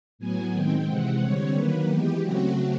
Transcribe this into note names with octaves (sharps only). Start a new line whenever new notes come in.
A2 F#3 B3 G#5
D#3 G#3 C4 G5
C3 E3 G#3 C4 F#5
D3 G3 C4 C#5
D#3 F#3 A#3 B4
E3 G#3 B3 G4
C#3 F#3 A3 C4 F#4